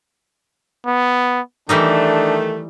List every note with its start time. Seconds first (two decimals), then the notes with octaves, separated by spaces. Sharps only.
0.86 B3
1.69 D#3 E3 G3 A3 D4 D#4